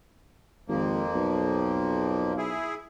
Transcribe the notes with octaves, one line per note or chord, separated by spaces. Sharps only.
G#1 F2 F3 A#3
B1
E4 G#4